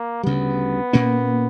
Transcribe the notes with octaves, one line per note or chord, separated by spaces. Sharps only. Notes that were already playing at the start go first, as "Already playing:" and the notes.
Already playing: A#3
D2 C#3 G3 B3
A#2 A#3 C#4